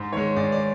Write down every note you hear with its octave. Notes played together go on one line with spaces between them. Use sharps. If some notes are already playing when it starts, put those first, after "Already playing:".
Already playing: G#2
D#3 G#3 C#5
G#2 D5
D5